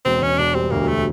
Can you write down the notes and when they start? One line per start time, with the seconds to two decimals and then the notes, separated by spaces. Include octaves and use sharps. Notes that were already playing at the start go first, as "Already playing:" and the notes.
0.05 E1 C4
0.22 E1 C#4
0.39 E1 D4
0.54 G3 C4
0.71 D2 A#3
0.88 A3